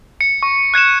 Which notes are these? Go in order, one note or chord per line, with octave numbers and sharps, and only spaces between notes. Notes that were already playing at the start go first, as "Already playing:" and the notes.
C#7
C#6
F#6 G#6 C#7 E7